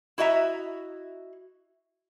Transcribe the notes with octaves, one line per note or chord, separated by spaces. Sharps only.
E4 F#4 D#5 E5 A#5